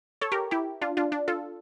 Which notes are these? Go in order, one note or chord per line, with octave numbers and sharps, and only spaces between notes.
A4 C#5
G4 A#4
E4 G4
D4 F4
D4 F4
D4
F4 A4